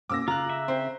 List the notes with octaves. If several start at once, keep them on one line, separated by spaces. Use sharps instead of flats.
B2 A#3 C#4 D6 E6 A#6
C#3 F4 A#5 F#6
E5
C4 C5